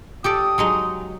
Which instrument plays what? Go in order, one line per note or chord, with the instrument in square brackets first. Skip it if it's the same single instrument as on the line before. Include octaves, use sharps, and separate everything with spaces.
[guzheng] G4 A4 D5 [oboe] D#6
[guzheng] F#3 G#3 D#4